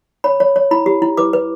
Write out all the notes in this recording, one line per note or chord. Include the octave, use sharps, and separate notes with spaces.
C#5 B5
C#5
C#5
E4 B5
G4
E4
B4 D6
B4